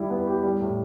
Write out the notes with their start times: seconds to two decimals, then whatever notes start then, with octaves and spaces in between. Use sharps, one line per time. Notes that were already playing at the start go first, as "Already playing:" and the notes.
Already playing: G3 E4
0.10 B3
0.27 G4
0.43 G3
0.61 A2